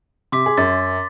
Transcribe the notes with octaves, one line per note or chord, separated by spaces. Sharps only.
C3 C6 D6 B6
G#4
F#2 A6